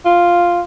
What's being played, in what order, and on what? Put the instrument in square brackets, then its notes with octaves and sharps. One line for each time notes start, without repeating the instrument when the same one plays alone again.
[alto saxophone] F4